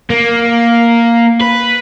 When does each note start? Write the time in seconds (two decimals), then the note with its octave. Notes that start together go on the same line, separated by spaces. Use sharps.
0.10 A#3
1.41 B4